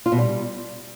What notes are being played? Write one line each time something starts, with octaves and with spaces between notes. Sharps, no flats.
F4
B2
G3